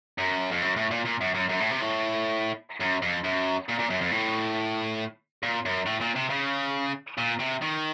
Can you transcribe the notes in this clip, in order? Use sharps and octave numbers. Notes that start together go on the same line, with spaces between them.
F#2
F2
F#2
A2
A#2
A#2
F#2
F#2
F#2
A2
C3
A2
F#2
F2
F#2
A#2
A#2
F#2
F2
A2
A#2
F#2
A2
A#2
C3
C#3
A#2
C3
D#3